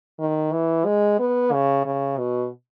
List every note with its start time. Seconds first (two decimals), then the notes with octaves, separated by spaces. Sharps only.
0.20 D#3
0.52 E3
0.85 G#3
1.20 B3
1.53 C#3
1.86 C#3
2.18 B2